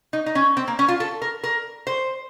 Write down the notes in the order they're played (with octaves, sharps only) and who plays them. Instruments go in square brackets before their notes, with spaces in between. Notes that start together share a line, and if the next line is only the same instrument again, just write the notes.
[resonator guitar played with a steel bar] D#4
D#4
C#4
C4
A#3
C#4
F4
A4
A#4
A#4
C5